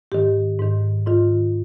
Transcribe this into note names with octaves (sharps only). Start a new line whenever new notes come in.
G#2 D#3 G4
G#2 D#3
G#2 D#3 F4